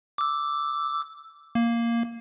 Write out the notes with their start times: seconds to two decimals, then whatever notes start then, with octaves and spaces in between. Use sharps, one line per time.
0.18 D6 E6
1.55 A#3